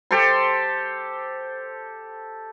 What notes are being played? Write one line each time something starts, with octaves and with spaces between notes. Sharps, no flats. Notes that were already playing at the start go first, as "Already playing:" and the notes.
G4 A4 C5 C6